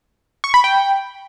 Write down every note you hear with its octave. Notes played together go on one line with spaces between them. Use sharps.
C#6
B5
G5